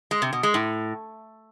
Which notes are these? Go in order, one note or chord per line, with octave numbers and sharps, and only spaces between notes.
G#3
C3
B2
G#3
A2